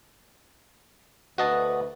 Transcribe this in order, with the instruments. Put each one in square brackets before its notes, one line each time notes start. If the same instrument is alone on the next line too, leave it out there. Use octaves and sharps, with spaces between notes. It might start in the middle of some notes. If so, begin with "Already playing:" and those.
[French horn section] D2 B4 [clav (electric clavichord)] F#4 D#5 A5